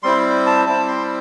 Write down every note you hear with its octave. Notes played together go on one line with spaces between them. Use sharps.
G3 C4 E4 C6
A5
G3 C4 E4 A5
C6